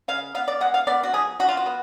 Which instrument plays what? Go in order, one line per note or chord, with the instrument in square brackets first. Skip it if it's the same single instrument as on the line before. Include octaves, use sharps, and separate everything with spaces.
[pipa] C#3 F5
B3 F5
D5
G#3 F#5
F5
B3 D5
F#4
F3 G#4
F3 F#4
F4
F#4
B3